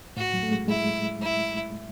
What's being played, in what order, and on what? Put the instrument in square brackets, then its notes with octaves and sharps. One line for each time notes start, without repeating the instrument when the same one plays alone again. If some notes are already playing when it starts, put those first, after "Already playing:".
[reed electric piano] A2 [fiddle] F#4
[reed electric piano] F#3
A3
G#3
[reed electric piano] G#3 [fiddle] E4
[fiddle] E4